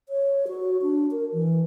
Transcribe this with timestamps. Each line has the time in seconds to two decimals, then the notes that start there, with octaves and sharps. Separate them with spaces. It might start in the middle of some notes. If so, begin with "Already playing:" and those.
0.09 C#5
0.48 F#4
0.82 D4
1.11 A#4
1.33 E3